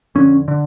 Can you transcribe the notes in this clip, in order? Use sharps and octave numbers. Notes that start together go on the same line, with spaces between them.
F2 D3 C#4
D3